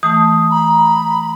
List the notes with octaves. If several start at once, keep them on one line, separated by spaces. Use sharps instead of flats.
E3 A3 A5 D#6
A#5 B5